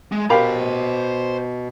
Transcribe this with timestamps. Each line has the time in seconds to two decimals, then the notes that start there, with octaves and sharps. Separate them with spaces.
0.12 G#3
0.30 B2 G4 A#4 C5 F5 A#5 B5